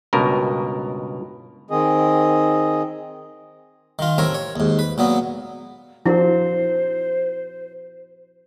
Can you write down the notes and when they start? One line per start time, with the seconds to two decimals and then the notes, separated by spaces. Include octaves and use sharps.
0.13 C#2 G2 B2 A#4
1.71 D#3 C4 G#4 D#5
3.99 D#3 F4
4.18 A1 C4 A#4 C#5
4.35 C#5
4.56 D#2 G#2
4.79 B4
4.98 A#2 F#3 B3
6.06 F3 D4 E4 F#4 A#4 C5